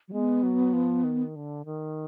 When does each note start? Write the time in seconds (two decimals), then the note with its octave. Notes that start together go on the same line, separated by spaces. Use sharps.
0.08 F#3
0.12 G#3 B3
0.43 F#3
0.73 F3
1.04 D#3
1.36 D3
1.65 D#3